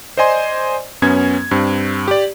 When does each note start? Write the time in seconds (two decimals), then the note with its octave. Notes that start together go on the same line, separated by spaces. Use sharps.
0.17 C5 D5 D#5 G#5 C6
1.02 F#2 B3 C#4 G#6
1.51 G2 C4
2.08 G4 D5